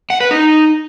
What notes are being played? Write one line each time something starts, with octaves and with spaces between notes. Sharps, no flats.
F#5
B4
D#4